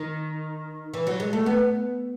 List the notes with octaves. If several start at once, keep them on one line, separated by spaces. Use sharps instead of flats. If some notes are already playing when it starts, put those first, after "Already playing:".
Already playing: D#3
E3
F#3
G#3
A3
B3